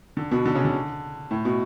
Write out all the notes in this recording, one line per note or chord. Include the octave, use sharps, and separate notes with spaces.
D3
B2
D3
C#3
D3
A2
B2